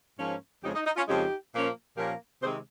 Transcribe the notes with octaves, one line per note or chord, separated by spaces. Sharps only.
G#2 F3 A#3 C#4
F2 C#3 F3 G#3 D#4 G4
D#4
D#4
C#4 F4
F2 C#3 F3 G#3 D#4 G4
A#2 F3 A#3 C#4
A#2 F3 A#3 C#4 G4 A#4
C3 D#3 G#3 C4 G#4 C5